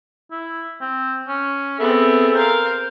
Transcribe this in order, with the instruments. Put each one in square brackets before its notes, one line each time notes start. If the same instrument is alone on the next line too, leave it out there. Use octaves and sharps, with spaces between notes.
[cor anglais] E4
C4
C#4
[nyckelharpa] B3 C4 [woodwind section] G#4 A4 [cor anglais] E5
[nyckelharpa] A#4 F5 [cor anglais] C5